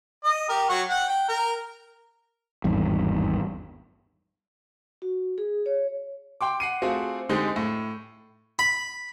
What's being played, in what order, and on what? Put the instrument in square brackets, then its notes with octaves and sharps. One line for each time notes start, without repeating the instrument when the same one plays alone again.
[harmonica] D#5
G4 A#4
F#3 F#5 C#6
F#5 G5
G5
A#4
[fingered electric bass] G#1 E2 G2
[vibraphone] F#4
G#4
C#5
[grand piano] G5 C6 D6
F#5 C7 D#7
A3 C4 F4 F#4 G#4
D3 G#3 C4 D#4 G4 G#4
A2
[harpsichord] B5